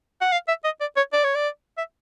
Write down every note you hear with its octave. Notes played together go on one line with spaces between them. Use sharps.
F#5
F5
E5
D#5
D5
C#5
D5
C#5
D5
E5